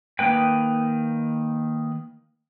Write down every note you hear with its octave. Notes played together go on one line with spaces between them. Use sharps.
D#3 A#3 B4 G5